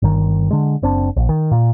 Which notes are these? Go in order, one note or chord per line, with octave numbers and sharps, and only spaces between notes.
G1 D#3
D3 G#3
F#1 C4 D4
A#1
D#3
A#2